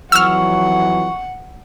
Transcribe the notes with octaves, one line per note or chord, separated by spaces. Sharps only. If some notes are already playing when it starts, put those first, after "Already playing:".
F2 E3 F#3 F#5 C#6 E6 F6